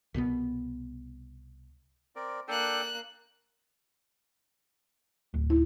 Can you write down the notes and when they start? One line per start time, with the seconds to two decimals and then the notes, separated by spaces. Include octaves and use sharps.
0.14 C2 B2 G#3 B3
2.16 C4 A#4 D5
2.48 A#3 D4 A4 G5 F#6
5.34 D1
5.50 E4